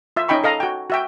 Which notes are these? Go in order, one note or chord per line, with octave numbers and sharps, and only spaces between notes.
F4 E5
C#4 D#4 D#5 G5 B5 C#6
A4 D#5 F5 A#5
F#4 G5
F#4 E5 G5